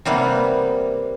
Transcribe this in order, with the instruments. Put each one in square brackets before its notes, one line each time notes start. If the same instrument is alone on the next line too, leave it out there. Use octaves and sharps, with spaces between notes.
[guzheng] C3 G3 A#3 B3